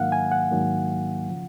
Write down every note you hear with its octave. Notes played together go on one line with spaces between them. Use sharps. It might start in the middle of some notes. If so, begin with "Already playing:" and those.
Already playing: G#2 D#3 F#3 A#3 F5 F#5
G#5
F#5
G#2 D#3 F#3 A#3
C#3 F3